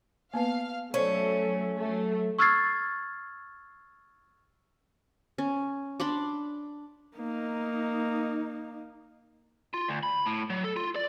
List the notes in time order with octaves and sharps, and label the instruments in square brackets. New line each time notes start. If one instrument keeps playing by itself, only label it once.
[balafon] A#3 B3 B4 [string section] F5
[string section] F#3 A3 [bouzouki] C#4 [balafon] C5 D5
[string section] F#3 A3
[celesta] C#6 E6 F6 G#6 A6 C7
[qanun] C#4
D4 B5 C6 D6
[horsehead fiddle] A#3 D#4
[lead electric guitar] F4
D2
B5
A2
F#3
A4
F4
D5